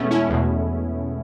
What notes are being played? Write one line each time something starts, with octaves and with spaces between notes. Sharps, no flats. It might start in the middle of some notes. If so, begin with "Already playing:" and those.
Already playing: E2 B2 G#3 A3 B3 C#4
C#4 E4
E2 B2